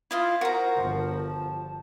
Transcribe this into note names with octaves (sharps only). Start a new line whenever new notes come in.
E4 F4 D#5 F5
F#4 A#4 C5 A#5
G1 F3
A5